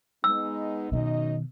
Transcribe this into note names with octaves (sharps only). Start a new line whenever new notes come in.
G#3 B3 D#4 E6
F#2 B2 D#3 D#4 D#5